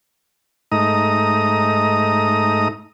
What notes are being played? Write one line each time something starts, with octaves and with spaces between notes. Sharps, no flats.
G#2 A3 D#4 A#5 D#6